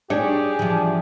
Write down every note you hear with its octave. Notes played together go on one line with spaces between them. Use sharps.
D4 G4 G#4 C#5
E3 F3